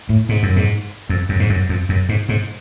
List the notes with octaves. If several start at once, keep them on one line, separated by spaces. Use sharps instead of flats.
A2
G#2
F#2
G#2
F2
F#2
G#2
F#2
F2
F#2
G#2
G#2